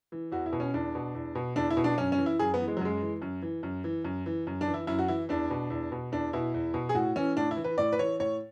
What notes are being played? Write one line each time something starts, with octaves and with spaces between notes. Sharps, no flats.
E3
E2 F#4
E4
B2
C#4
E2 D4
B2
E2
B2
E2 D4
E4
B2
D4
F#2 C#4
C#4
E3
E4
F#2 G#4
B3
E3
G#3
F#3
F#2 G#3
E3
F#2
E3
F#2
E3
F#2
E3
F#2
D4
E3
E4
F#2 E4
F#4
E3 E4
E2 D4
B2
E2
B2
E2 D4
B2 E4
E2
B2
G#4
A2 F#4
E3 C#4
A2 D4
E4
E3
B4
A2 D5
B4
E3 C#5
A2 C#5